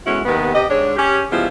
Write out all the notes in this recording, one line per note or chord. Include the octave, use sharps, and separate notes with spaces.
G#3 B3 C#4 E4 F#4 A4
D#2 C3 D#3 B3
C3 C4 G4 D#5
G#2 D4 C#5
C#4 G4
C#3 F3 G3 G#3 B3 E4